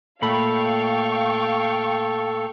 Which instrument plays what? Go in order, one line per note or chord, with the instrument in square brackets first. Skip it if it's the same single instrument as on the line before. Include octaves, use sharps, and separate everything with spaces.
[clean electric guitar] A#2 A3 B5 [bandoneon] A4 [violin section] F5 G5 C#6